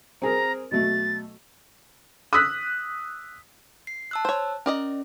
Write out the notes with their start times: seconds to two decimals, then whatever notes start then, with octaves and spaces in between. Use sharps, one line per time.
0.22 C4 G#4 A#4 A#5
0.71 B2 F#3 A3 A6
2.33 D#6 E6 F#6 B6
3.87 C7
4.11 A5 E6 F#6
4.25 C5 C#5
4.66 C#4 A#4 D5 D#5